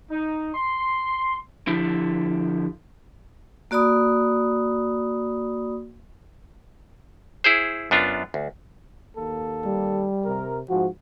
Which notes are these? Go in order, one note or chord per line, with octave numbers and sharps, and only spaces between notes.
D#4
C6
D3 F3 E4 G4
A#3 F#4 D5 B5 D#6
E4 G#4 C5
F#2 B3 D4 F4
D2
D#2 A#3 A4
G3
C3 A#4
G#2 F3 F#4